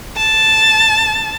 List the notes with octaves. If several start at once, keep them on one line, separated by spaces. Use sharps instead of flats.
A5